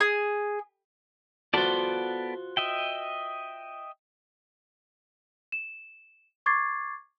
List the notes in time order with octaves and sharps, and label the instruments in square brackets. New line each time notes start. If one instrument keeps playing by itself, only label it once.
[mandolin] G#4
[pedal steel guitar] B3 A4 D5 [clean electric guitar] F4 F#4 C5
[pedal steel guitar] D#5 E5 G5
[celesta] E7
C#6 D6 G#6 A6 C7